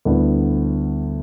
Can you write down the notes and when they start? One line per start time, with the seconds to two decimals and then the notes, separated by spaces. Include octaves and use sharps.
0.05 D2 D3 G3 B3 E4